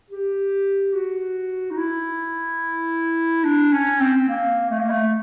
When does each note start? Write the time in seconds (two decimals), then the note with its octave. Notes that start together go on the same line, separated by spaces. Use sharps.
0.10 G4
0.94 F#4
1.71 D#4
1.78 E4
3.44 D4
3.72 C#4
4.00 C4
4.28 A#3
4.70 A3
4.80 A#3
4.90 A3